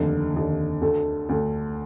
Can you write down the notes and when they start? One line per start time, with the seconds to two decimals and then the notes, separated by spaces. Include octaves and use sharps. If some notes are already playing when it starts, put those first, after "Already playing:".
Already playing: F1 D#2 D3
0.34 F1 D#2 D3
0.81 D2 D3 A3
1.29 D2 D3 A3